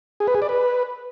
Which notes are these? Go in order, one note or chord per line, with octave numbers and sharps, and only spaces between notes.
G#4
B4
G#4
D5
B4